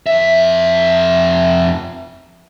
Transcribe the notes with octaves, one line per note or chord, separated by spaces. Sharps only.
F2 E5